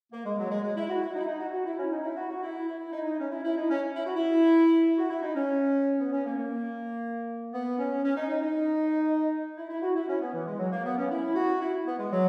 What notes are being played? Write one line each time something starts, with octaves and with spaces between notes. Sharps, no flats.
A#3
G#3
F#3
G#3
G#3
E4
F#4
E4
D#4
E4
D#4
F#4
F#4
E4
C#4
D#4
E4
F#4
F#4
E4
E4
D#4
D#4
C#4
E4
E4
D#4
C#4
E4
F#4
E4
F#4
E4
D#4
C#4
B3
C#4
A#3
A#3
B3
C#4
C#4
D#4
D#4
D#4
E4
E4
F#4
E4
C#4
B3
E3
G#3
F#3
A#3
B3
C#4
E4
F#4
E4
B3
G#3
F#3